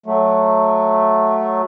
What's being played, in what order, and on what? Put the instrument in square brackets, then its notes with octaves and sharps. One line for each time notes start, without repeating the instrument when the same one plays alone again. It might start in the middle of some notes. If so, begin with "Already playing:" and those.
[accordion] F#3 A3